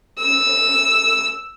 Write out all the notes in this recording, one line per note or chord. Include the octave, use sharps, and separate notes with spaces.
E6